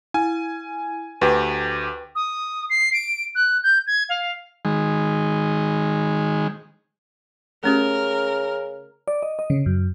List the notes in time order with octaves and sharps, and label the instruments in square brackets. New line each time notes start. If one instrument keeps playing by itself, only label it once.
[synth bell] E4 [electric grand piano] G#5
[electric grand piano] D2 G4 [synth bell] B4 G5
[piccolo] D#6
C7
D7
F#6
G6
G#6
F5
[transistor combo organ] D#3 G#3
[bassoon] C#3 [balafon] A3 C#4 G4 [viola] A#4
[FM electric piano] D5
D#5
D#5
C#3
F#2